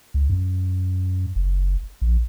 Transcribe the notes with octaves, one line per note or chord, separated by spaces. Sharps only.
C#2
F#2
F#1
A#1